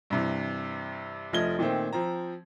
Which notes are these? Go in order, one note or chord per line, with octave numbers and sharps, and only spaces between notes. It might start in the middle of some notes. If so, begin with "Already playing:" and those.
G2 C3 E3
F1 F3 A3 D#5 G#6 G7
A#2 D#3 A3 C4
F3 C4 A#5